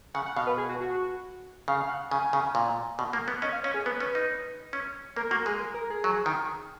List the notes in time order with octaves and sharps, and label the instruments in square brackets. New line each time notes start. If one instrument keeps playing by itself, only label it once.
[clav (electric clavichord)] C#3 [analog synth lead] F#5
[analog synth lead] F#5
[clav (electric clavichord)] B2 [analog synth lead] F5
[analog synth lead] B4
G#4
F#4
F#4
[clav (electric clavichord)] C#3 [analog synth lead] F5
[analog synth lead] F5
F#5
[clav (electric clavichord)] C#3 [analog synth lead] G#5
[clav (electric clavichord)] C#3
A#2
B2
A#3
B3
[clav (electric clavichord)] C#4 [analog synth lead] D#5
[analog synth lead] F5
[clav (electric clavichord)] C#4 [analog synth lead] C#5
[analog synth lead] G#4
[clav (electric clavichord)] B3 [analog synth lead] B4
[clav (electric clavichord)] C#4
D#4
C#4
[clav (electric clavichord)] A#3 [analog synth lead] A#4
[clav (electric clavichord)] A#3 [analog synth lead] F#4
[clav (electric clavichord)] G#3 [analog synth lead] G#4
[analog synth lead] A#4
A#4
G#4
[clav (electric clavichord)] F#3
D#3